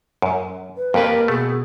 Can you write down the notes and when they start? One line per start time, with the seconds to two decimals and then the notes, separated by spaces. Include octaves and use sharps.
0.22 F#2
0.77 B4
0.94 F2 A#3 G4 A#4 B4
1.28 B2 A3 G#4